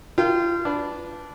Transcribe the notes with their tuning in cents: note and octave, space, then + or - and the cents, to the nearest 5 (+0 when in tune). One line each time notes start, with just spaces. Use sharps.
F4 -30 A#4 +0 G5 -10
D4 -15 B4 +0